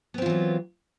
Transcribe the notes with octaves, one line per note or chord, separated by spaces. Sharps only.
E3 F#3 B3 C4 F4